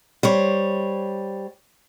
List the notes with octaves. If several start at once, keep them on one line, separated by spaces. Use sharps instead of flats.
G3 C5 C#5